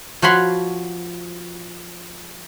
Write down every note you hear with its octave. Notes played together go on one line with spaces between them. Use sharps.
F3 F#4 C#5 B5 C6